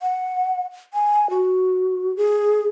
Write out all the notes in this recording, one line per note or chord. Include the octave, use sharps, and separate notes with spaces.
F#5
G#5
F#4
G#4